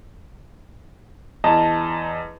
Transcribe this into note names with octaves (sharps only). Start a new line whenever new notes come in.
E2 D#5 A5 A#5